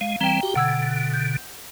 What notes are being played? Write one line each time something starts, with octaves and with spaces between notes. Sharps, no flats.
G#3 F5
E3 G3 C4 G5 A#5
F#4 G4
B2 D3 F#5 E6 G#6
G6